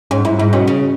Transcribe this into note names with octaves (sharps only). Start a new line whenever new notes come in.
G#2 C#4
G#2 E4
G#2 E4
B2 C#4
C#3